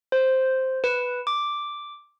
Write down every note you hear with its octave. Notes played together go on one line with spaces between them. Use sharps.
C5
B4
D6